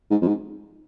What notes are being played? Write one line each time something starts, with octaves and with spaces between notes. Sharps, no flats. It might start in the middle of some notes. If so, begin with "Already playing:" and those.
G#2
F2
G#2